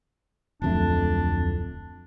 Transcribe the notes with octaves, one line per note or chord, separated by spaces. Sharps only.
D1 F2 A3 D4